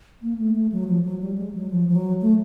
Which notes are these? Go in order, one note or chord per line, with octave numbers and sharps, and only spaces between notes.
A#3
A3
A3
F#3
F3
F#3
G3
G#3
F#3
F3
F3
F#3
A3